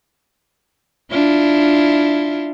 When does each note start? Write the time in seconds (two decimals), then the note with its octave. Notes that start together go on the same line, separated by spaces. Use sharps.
1.11 D4 E4 F4